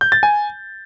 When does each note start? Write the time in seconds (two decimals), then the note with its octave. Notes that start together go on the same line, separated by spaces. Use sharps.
0.01 G6
0.12 A6
0.23 G#5